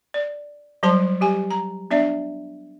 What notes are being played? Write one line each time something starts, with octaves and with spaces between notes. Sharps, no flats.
D5
F#3 G3 C5 A5 C6
G3 G4 G#5
A#5
B3 D4 D5 E5